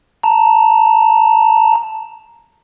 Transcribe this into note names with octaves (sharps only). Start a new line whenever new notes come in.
A5 A#5